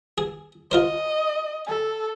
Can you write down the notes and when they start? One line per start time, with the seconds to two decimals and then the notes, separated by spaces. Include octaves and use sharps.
0.18 G#4
0.71 F4 A#4 C5 D#5
1.67 A4